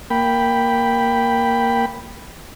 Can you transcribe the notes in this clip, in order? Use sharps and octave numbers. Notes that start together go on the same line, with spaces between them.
A#3 G5 B5